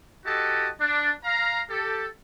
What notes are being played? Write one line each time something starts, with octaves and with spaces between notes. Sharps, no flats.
E4 F#4 G4 A4 D#5 A5
D4
F5 A#5
G4 A4